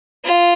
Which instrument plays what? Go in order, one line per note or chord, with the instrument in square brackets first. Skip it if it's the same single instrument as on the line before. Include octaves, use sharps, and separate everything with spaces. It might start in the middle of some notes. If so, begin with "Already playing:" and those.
[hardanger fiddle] F4